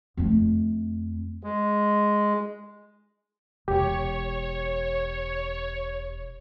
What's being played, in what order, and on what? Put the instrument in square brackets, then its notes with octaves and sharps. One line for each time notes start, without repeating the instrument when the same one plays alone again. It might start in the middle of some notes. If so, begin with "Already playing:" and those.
[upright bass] F2 A3
[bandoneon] G#3
[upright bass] E1 [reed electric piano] G4 [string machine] C#5